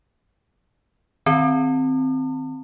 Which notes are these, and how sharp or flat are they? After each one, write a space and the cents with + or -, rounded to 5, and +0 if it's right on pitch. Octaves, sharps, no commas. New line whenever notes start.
D#3 -5 C4 -5 A5 +45